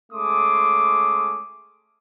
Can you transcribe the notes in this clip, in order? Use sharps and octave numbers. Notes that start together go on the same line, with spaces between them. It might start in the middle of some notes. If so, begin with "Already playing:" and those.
G#3 A3 C#4 C6 D6 D#6